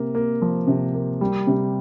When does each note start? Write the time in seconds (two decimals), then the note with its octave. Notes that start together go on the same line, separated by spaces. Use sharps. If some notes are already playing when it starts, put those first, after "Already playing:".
Already playing: C3 A#3
0.15 A#3
0.42 F3
0.67 C3
0.94 A#3
1.21 G3
1.47 C3